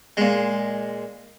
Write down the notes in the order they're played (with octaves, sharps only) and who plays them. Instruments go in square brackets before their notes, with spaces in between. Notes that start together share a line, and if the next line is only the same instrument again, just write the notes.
[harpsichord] A#2 G#3